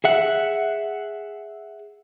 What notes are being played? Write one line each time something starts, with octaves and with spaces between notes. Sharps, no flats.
G#4 E5 F#5